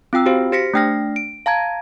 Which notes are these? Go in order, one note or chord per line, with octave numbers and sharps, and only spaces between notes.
C4 F4 G5 E6
F#4 G4 C5 F5
G4 C5 A#6 B6 C#7
A3 D4 G5 F6 A#6
D7
F5 A5 A#5 G#6